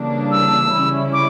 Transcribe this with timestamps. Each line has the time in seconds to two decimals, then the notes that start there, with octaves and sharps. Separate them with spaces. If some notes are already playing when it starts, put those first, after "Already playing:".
Already playing: C#3 E3 G3 A#3 D4
0.31 E6
0.72 C#3 G3 C#4 E4
1.13 D6